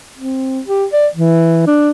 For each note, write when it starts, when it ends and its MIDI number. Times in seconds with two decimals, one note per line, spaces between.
0.17 0.60 60
0.66 0.85 67
0.93 1.07 74
1.15 1.67 52
1.67 1.91 62